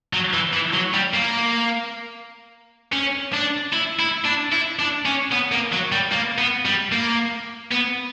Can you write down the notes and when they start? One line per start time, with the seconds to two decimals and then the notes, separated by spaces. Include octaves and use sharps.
0.13 F#3
0.33 E3
0.53 E3
0.73 F#3
0.94 G3
1.13 A#3
2.93 C#4
3.33 D4
3.73 E4
3.99 E4
4.25 D4
4.53 E4
4.79 D4
5.06 C#4
5.32 B3
5.52 A#3
5.72 F#3
5.92 G3
6.12 A#3
6.38 B3
6.65 G3
6.92 A#3
7.72 B3